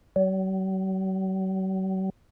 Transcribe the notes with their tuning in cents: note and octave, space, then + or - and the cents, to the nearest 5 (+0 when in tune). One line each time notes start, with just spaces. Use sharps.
F#3 +45